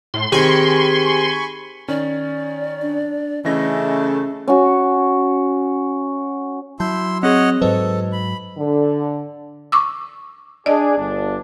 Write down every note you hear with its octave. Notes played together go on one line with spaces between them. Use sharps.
A2 C6
D#3 C4 G4 G#4 G#5 B5 C#6
D#3 C#4 D5
D4
C#3 E3 A3 C#4 D#5 E5 A#6
C#4 F#4
F#3 E4 A5 C6 G6
C4 G#4 C#5 D#5 F#5
G#2 F#3 A4 B4 C5 D#5
B5
D3
C#6 D6 E6
D4 G#4 D5 D#5
G1 D4